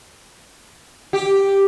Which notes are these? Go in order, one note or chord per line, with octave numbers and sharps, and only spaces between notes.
G4